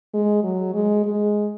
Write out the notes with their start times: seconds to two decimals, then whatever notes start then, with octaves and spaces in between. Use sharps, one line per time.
0.14 G#3
0.43 F#3
0.74 G#3
1.04 G#3